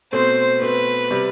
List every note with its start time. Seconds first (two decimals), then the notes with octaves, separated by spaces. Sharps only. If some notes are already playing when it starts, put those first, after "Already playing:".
0.12 B2 A3 C4 C5
0.61 B2 A3 C4 B4
1.11 C3 G3